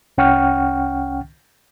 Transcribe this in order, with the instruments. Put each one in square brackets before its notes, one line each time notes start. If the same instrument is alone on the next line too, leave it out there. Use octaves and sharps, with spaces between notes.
[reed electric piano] C2 C#4 F#5 G5 C#6 F6